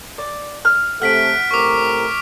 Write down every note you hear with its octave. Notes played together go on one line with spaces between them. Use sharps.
D5
F6
C3 A3 F#5 F6 B6 D7
A2 C3 A#4 C#6 D6